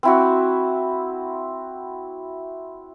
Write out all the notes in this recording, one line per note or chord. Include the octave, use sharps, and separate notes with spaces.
C4 E4 F#4